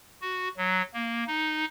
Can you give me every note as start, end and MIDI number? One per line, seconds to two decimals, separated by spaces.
0.21 0.48 66
0.57 0.82 54
0.94 1.24 58
1.27 1.65 63